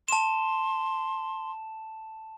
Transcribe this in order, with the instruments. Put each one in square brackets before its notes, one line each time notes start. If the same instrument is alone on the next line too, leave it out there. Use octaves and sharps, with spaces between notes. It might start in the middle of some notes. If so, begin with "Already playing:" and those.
[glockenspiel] A5 E7 [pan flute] C6